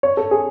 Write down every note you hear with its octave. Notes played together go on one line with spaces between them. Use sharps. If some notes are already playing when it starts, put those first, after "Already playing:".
C#5
A4
G#4